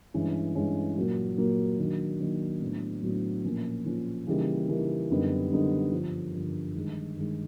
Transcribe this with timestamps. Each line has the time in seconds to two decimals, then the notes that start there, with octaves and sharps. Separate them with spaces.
0.14 G2 E3 G#3 C#4
0.55 G2 E3 G#3 C#4
0.97 A#2 F#3 A#3
1.38 A#2 F#3 A#3
1.78 D#3 F#3 A#3 D4
2.20 D#3 F#3 A#3 D4
2.62 A2 F#3 B3 D4
3.03 A2 F#3 B3 D4
3.44 A#2 F3 A#3 C#4
3.85 A#2 F3 A#3 C#4
4.27 C#3 E3 G3 A#3 D#4
4.68 C#3 E3 G3 A#3 D#4
5.09 F#2 D3 G3 B3 D#4
5.51 F#2 D3 G3 B3 D#4
5.92 G2 D3 F3
6.33 G2 D3 F3
6.75 G2 D#3 G#3
7.16 G2 D#3 G#3